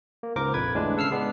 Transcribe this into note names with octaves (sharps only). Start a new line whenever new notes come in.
A#3
C#2 G#2 A#4 C5 D6
A#1 F2 B4 G#6
A2 D3 E3 G#3 D4
C#3 A4 E6 F6 C7
G#3 B3 D4